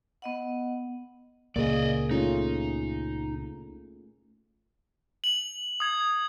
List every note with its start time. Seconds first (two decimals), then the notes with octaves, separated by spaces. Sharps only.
0.22 B3 D#5 F#5
1.56 C#2 A#2 C#3 A#3 G#4 D5 D#5
2.11 A3 C#4 D#4 F4
5.24 F#7
5.80 D#6 G#6